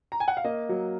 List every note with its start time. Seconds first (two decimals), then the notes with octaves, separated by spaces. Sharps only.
0.12 A#5
0.20 G#5
0.28 F#5
0.37 F5
0.44 A#3 D#5
0.69 F#3